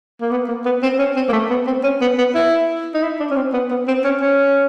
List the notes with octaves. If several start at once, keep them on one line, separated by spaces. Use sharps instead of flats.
A#3
B3
A#3
B3
C4
C#4
C4
A#3
A3
B3
C4
C#4
B3
B3
E4
D#4
E4
D4
C#4
C4
B3
B3
C4
C#4
C#4